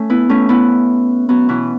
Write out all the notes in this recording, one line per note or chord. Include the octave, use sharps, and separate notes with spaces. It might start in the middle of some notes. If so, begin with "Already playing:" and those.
Already playing: A3 C#4
B3 E4
A3 C#4
B3 E4
F#3 B3
B2 E3